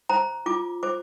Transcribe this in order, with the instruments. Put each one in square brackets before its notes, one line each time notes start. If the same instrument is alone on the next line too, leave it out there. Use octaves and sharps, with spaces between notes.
[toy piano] C5 A#5
F4 D6
C5 D6